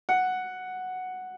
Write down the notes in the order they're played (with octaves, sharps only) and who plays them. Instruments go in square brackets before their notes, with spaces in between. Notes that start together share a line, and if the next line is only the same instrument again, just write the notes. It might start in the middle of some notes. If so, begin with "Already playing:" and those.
[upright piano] F#5